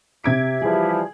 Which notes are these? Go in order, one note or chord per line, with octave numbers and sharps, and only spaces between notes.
C3 G4 E5 G#6 D7
E3 F3 G3 G#4